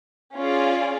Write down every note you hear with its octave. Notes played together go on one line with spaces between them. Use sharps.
C#4 F4 G#4 D5 F5